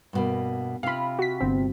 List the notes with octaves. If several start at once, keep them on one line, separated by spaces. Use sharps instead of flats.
G2 B2 A#3
C3 F4 F5 B5
F#4 B6
G1 C4